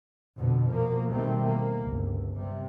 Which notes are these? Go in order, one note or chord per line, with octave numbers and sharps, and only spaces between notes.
F2 B2 D3
B2 F3 A#3
B2 D#3 G3 A3 A#3 C4
A#3
G1 C#2
C3 G3